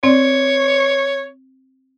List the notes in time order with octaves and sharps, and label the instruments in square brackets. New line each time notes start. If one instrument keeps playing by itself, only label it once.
[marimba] C4 D5 [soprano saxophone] C#5